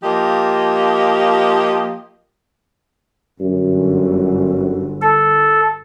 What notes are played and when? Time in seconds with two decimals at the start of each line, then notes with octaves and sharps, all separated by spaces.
0.04 F3 A#3 G4 D#5
3.41 G1 F#2
5.01 A4